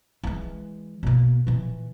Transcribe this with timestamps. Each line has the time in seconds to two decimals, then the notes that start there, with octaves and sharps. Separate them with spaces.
0.23 E3 G#3
1.03 B2 A#3
1.47 A#2 E3